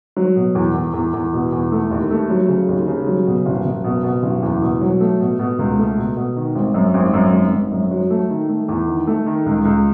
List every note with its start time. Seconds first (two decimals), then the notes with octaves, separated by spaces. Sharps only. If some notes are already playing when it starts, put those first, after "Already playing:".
0.17 F#3
0.36 B2
0.55 E2
0.74 E2
0.93 E2
1.13 E2
1.33 B2
1.52 E2
1.72 A3
1.91 D#2
2.11 A3
2.30 F#3
2.48 C#3
2.69 D#2
2.88 C#3
3.07 F#3
3.26 B2
3.46 F#1
3.65 F#1
3.84 B2
4.04 B2
4.23 F#1
4.43 E2
4.62 B2
4.81 F#3
5.00 A3
5.20 B2
5.39 B2
5.59 C#2
5.78 A3
5.98 B2
6.16 B2
6.36 D#3
6.55 G#1
6.74 F#2
6.94 G#1
7.14 F#2
7.33 G#1
7.52 G#1
7.72 F#2
7.91 F#3
8.10 A3
8.30 D#3
8.49 A3
8.69 E2
8.88 D#3
9.07 A3
9.26 D#3
9.46 C#2
9.65 C#2